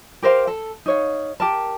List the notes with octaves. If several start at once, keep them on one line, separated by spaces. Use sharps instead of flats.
G4 A#4 C5 F5
A4
D#4 C#5 F5
G4 A#4 A5